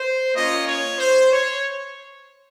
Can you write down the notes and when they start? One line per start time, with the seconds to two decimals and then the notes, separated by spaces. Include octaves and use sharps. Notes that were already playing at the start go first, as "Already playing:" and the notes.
Already playing: C5
0.34 A#3 C#4 F4 D#5
0.67 C#5
0.99 C5
1.32 C#5